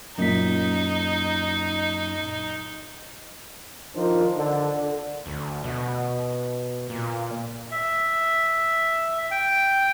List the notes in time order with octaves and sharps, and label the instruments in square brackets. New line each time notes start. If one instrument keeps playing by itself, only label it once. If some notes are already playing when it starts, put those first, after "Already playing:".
[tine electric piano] F#2 A#2 B6 [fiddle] D#4
[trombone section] D#3 F3 D4 A#4 C5
D3
[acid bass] D2
B2
A#2
[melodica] E5
G5